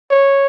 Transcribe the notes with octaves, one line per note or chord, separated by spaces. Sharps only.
C#5